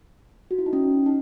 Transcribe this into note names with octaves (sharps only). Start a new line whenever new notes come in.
F#4
E4
D#4
C#4
D#4